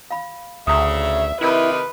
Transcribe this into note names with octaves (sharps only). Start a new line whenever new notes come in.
F5 B5
D2 C#3 E5 A#5 D#6
C3 D#3 E4 B4